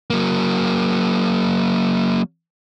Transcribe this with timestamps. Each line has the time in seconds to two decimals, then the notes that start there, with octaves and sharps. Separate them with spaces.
0.10 F#3 A#3